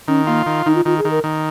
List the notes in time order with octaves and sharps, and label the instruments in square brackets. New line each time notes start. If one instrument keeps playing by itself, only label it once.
[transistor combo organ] D#3 [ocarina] C#4
[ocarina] A#3 [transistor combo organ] F4
[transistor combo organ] D#3
[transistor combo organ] D#3 [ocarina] D#4
[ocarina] F4
[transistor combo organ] D#3 [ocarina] F4
[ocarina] G#4
[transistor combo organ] D#3
[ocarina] A#4
[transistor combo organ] D#3